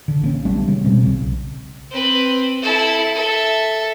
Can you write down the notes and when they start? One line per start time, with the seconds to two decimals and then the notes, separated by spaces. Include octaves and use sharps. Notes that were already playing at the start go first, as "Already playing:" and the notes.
0.08 D3
0.21 A#1 A#3 C#4
0.45 G3 A3 B3 D4
0.68 C#3 G3 C#4
0.84 B2 G3 G#3 C4
1.03 B1 C#3
1.91 C4 B4
2.62 E4 A4
3.15 A4 E5